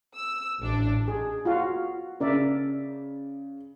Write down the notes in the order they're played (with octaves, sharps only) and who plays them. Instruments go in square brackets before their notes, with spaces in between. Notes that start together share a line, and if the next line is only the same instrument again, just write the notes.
[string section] E6
A1 D4
[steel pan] G#4
F4 F#4 F5
[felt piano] C#3 [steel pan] A#4 D5 E5